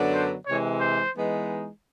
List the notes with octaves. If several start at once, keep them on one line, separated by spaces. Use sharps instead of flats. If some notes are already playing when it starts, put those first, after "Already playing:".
Already playing: F#2 D3 F#3 B3 D4
C5
C3 E3 G#3 C#5
C5
E3 G#3 B3 D#4